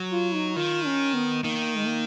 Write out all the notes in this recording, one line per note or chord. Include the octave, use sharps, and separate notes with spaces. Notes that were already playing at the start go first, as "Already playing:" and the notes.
Already playing: F#3
F4
D#4
D#3 F4
C#4
B3
D#3 A#3
G#3
A#3